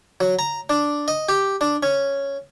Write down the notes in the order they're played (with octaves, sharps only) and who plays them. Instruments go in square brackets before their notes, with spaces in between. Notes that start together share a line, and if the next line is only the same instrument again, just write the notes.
[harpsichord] F#3
A#5
D4
D#5
G4
D4
C#4